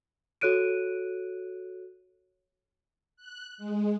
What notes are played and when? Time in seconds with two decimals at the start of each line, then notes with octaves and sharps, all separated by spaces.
0.41 F#4 A4 C#5 F#6 D7 D#7
3.17 F#6
3.58 G#3